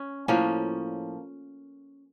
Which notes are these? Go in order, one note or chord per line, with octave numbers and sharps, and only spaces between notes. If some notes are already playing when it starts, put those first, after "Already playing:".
Already playing: C#4
A2 F3 A#3 C#4